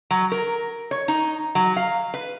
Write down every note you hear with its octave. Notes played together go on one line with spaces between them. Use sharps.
F#3
A#4
C#5
D#4
F#3
F5
B4